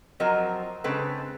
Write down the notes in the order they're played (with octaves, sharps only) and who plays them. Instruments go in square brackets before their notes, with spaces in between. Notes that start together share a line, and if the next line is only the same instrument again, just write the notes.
[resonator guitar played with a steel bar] F3 F#3 C4 A#4 D#5
C#3 G#3 C4 A4 B4